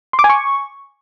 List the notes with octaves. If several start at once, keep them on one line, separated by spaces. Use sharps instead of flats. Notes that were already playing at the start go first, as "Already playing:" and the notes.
C6
D6
G#5
C#6